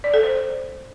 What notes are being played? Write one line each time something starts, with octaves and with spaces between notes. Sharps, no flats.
D5
A4
C5